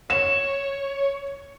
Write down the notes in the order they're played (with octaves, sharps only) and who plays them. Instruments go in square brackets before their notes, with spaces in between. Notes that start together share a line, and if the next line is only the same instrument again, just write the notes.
[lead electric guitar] C#5 [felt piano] E7